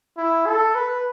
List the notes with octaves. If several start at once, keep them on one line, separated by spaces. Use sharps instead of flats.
E4
A4
B4